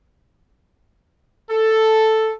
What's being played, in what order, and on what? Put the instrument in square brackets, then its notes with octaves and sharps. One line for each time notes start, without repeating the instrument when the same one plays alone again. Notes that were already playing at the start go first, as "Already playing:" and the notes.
[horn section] A4